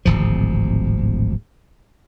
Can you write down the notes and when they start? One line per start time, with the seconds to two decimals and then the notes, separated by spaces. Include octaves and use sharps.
0.05 D1 G#1 F3